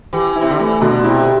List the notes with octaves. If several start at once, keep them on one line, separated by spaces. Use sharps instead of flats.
E3 G4
E4
C3
D3
E3 A3
B2 D3
C3 E4